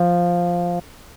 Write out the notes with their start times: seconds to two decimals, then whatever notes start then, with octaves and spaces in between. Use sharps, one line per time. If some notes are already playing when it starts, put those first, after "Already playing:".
Already playing: F3